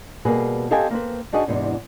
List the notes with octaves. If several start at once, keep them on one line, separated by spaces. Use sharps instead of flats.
B2 G3 A#3 G#4 B4
C4 G4 A4 D#5 F5 G#5
A#3 C4 B4
D4 D#4 F#4 G#4 B4 D#5
E2 G#2 C3 B3 D4